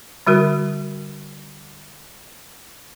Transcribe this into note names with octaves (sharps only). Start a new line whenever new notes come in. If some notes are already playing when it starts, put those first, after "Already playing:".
D3 G3 F#4 A#4